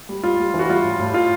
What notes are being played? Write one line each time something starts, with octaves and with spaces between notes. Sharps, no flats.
G3
G3 F4
G3
E3
F#4
G3 F4
A2
A2
F4